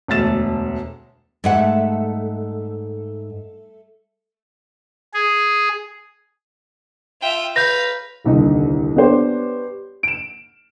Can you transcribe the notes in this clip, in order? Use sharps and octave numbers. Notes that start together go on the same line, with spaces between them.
E1 D2 A3 A6 E7
G#2 G3 A3 F#5
G#4
F4 E5 G5
B4 F5 G6 A#6
D#1 C2 D3 D#4
B3 D4 G4 C5 C#5
D7 E7